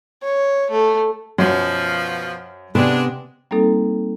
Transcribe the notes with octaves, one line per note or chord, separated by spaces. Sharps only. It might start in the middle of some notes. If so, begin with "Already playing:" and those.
C#5
A3
F#2 B2 F3 C5
C3 G#3 B3 D4 B4
G3 A#3 C4 D#4 A4